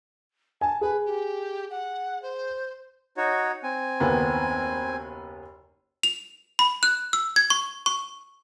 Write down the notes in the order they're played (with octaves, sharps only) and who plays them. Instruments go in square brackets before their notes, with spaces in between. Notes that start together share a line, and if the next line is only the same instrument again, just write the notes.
[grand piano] G#5 [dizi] A5
[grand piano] G#4 [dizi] B4
[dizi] G4
F#5
C5
[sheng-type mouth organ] D#4 F#4 C#5
C4 G#5
[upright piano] F#1 D#2 B3
[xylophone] F7
B5
F#6
E6
G#6
C#6
C#6